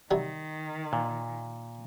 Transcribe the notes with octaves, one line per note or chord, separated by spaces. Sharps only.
C3 D#3 F#3 G3
A#2